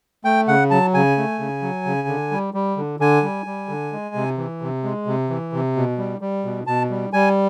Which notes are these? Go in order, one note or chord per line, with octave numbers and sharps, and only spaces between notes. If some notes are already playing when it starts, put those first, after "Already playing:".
A3 G5
C#3 F#5
F#3 A5
C#3 G#5
A3
C#3
F#3
C#3
D3
G3
G3
D3
D3 G#5
G3
G3
D3
G#3
C3
E3
C3
G#3
C3
E3
C3
B2
G3
G3
B2
B2 A5
G3
G3 G#5